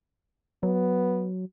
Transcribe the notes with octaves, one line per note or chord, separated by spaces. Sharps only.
F#3 B3